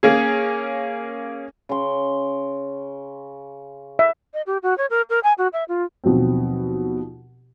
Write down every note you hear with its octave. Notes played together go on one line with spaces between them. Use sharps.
A#3 C#4 G#4
C#3 C6
E5
D#5
G4
F#4
C#5
A#4
A#4
G#5
F#4
E5
F4
D#2 B2 F3 F#3 C4